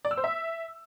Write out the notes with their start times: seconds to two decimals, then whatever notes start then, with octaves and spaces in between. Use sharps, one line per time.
0.05 D5
0.11 E6
0.17 C5
0.24 E5